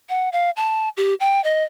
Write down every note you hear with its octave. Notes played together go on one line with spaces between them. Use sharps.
F#5
F5
A5
G4
G5
D#5